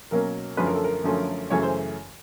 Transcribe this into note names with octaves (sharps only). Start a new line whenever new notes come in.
B2 F#3 A#3 C#4 A#4
F#2 D3 F3 A3 C#4 B4
A#4
A4
A#4
F#2 D3 F3 A3 C#4
F#2 C#3 E3 A3 C#4 C#5
C5